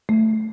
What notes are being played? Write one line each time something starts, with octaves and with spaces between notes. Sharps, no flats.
A3